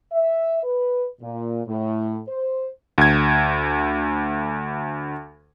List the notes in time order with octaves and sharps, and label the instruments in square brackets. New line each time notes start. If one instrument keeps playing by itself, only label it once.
[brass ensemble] E5
B4
A#2
A2
C5
[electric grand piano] D2 G#6